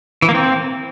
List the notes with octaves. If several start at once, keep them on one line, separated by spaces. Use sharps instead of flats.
E3
A#3
C4